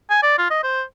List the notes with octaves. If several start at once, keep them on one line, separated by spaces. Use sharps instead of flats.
G#5
D5
F4
D#5
C5